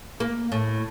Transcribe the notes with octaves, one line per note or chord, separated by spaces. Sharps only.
A#3
A2